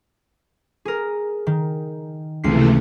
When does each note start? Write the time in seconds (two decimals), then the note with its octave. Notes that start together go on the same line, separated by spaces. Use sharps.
0.85 G#4 A#4
1.47 D#3
2.44 C#2 C3 E3 A3 C7